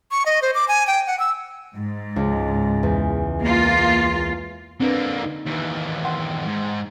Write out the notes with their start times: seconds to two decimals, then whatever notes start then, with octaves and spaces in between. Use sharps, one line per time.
0.11 C#6
0.26 D#5
0.42 C5
0.55 D6
0.68 G#5
0.87 G5
1.07 F#5
1.19 E6
1.75 G#2
2.16 C#2
2.83 E2
3.42 A#3 F4
4.80 D3 A#3 C4 D4 B4
5.24 D#4
5.46 D#2 E3
6.05 F#5 G5 C6
6.46 G#2